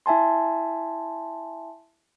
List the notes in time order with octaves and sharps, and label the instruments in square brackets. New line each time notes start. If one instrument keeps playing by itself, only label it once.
[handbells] E4 E5 G#5 A5 C6